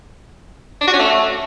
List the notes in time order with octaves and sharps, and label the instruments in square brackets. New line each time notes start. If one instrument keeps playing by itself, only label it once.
[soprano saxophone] D4
F#4
C#4
A3